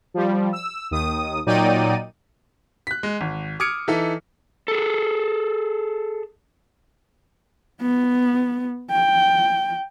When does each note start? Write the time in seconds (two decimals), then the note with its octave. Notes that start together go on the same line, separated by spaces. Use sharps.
0.14 F3 G3
0.53 E6
0.91 D#2 D#3 D#6
1.46 A#2 F#3 D#4 D5 G5 D#7
2.87 F#6 B6
3.03 G#3
3.21 G#1
3.60 D6 D#6 F6 G#6 C#7 D7
3.88 E3 D#4 A4 E5
4.68 G#4 A4
7.81 B3
8.91 G5